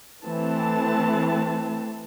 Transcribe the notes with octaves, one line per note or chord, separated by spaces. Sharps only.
E3 A3 C4 A5